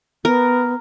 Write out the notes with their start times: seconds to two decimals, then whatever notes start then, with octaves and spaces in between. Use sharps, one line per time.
0.25 B3 A#4